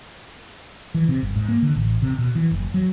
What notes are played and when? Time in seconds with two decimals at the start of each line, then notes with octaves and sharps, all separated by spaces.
0.95 E3
1.08 C3
1.22 G1
1.36 G#2
1.48 A#3
1.62 D3
1.76 A1
2.02 C3
2.19 B2
2.35 E3
2.51 F#1
2.74 F#3